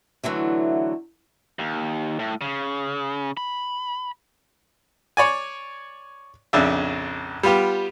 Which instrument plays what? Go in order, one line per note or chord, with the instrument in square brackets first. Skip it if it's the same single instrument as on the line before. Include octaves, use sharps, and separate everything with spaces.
[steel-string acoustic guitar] D3 E3 F#3 A3
[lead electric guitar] D#2
A2
C#3
B5
[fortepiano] C#5 D5 G#5
A#1 F2 C#3 D4 E5
G3 B3 F4 G4